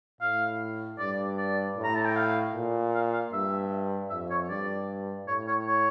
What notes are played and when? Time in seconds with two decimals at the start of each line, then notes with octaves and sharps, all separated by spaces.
0.21 A2 F5
0.99 G2 D5
1.38 D5
1.76 A2
1.84 A#5
1.95 A5
2.05 G5
2.16 F5
2.55 A#2
2.94 F5
3.13 F5
3.33 G2 E5
4.10 F2 E5
4.30 C#5
4.49 G2 D5
5.27 A2 C#5
5.47 C#5
5.67 C#5